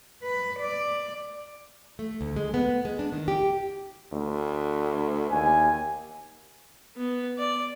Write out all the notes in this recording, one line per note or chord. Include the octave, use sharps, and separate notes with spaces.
B4
D5
A3
D2
G#3
B3
G#3
D4
D#3
G4
D2
D#2 G#5
B3
D5